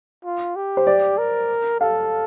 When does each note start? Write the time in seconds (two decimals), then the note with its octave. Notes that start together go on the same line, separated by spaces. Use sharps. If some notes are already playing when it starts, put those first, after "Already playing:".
0.25 F4
0.56 G4
0.77 C5
0.87 D5
1.18 A#4
1.81 A4 F5